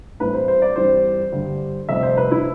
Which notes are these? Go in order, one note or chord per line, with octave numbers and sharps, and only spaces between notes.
A1 A2 G3 C4 B4
C5
C5
D5
G2 E3 G3 C4 C5
G2 D3 G3
F1 F2 C3 G3 C4 E5
C5
B4
E4